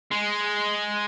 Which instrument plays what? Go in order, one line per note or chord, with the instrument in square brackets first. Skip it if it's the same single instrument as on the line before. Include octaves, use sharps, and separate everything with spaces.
[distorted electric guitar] G#3